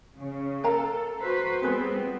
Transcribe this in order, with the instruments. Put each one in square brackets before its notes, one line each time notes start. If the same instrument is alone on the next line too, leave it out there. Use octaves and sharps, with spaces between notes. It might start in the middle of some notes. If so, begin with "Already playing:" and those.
[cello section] C#3
[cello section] A4 [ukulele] A#4 F5 A#5
[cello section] F#4 B4 C5
[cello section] G3 B3 C4 [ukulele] F4 G#4 B4